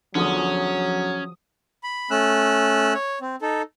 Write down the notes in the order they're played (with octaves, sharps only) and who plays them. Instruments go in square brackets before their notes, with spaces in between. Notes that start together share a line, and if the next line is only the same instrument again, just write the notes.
[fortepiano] E2 D3 [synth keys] F3 D#6 [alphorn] F#3 [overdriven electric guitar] C#4
[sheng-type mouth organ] B5
A3 C#4 E6 F#6
C#5
C4
D#4 A4